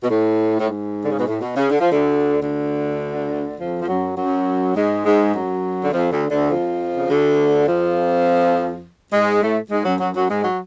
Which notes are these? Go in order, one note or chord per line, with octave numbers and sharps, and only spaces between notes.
B2
A2
A2
G#2
D3
C#3
B2
A2
B2
C#3
D3
F3
D2 D3
D2 D3
F2 F3
F3
F#2 F#3
F#2 F#3
G#2 G#3
G#2 G#3
F#2 F#3
D3
F2 F3
D2 D3
D2 D3
F2 F3
C#3
D2 D3
F2 F3
G#2 G#3
A2 A3
G#2 G#3
F#2 F#3
F#2 F#3
F#2 F#3
G#2 G#3
F#3